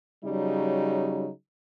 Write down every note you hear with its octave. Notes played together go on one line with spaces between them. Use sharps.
C#3 F#3 G3 D#4